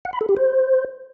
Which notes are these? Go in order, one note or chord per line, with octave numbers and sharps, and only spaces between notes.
F#5
B5
A4
G4
C5